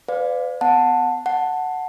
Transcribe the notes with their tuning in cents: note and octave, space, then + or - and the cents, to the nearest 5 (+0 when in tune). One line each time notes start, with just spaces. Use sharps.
B4 +40 D5 +0 F5 +10
B3 +20 F#5 -20 A5 +5
F#5 +0 A5 +5